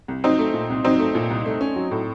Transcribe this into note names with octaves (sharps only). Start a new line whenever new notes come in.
C2
F#3 C4 D#4
A3
A#2
C2
F#3 C4 D#4
A3
A#2
C2
A3
C#4
F#3
A2